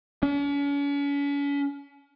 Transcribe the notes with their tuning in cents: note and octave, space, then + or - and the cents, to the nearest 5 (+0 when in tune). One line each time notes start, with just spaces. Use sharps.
C#4 +40